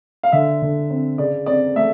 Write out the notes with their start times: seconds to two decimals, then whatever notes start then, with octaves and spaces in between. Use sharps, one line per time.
0.23 F5
0.32 D3 E5
0.62 D3
0.90 C4
1.18 C#3 D5
1.46 C4 D5
1.76 A3 E5